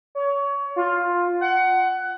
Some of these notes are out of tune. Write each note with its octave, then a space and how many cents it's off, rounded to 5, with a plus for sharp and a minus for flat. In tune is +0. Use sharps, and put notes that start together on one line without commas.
C#5 +25
F4 +10
F#5 +20